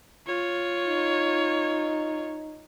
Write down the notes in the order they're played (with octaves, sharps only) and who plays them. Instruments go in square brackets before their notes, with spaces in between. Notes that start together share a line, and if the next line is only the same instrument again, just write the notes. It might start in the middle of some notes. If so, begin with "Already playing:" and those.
[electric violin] F4 C#5
[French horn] D#4